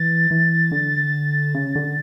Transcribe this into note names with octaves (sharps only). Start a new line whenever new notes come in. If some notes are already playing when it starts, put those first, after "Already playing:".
Already playing: E3 A6
E3
D3
C#3
D3